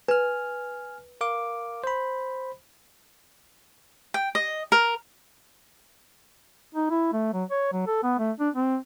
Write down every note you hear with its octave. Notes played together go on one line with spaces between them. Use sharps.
B4 G#5 F6
A#4 F5 D6
C5 B5
G5
D#5
A#4
D#4
E4
A3
F#3
C#5
F#3
A4
B3
A3
D4
C4